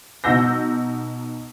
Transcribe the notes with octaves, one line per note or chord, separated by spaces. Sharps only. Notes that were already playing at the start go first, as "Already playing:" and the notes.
B2 D#4 F#5 E6 G6 A#6